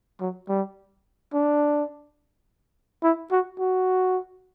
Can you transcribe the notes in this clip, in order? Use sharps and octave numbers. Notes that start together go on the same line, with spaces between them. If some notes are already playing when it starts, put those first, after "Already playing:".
F#3
G3
D4
E4
F#4
F#4